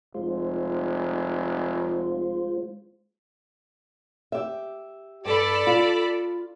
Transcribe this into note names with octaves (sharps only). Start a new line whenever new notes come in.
F1 G#3 F4 C5
G4 E5
G2 A4 D5 B5
F4